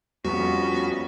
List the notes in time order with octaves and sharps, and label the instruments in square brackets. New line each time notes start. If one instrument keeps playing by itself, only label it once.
[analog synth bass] F2 [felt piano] G3 [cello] B3 C#4 [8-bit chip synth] F#4